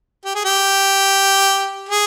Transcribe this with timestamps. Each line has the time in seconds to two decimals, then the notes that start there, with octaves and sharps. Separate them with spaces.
0.25 G4
0.35 G#4
0.45 G4
1.89 G#4